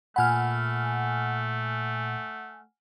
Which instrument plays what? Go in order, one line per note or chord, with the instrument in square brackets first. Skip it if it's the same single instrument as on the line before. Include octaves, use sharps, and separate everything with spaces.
[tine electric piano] A#2 B5 [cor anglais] A3 [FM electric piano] F#5 G#5 F6